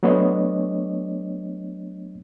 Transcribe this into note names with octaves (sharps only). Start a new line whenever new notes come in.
F#3 A3 B3 D4 C#5 D#5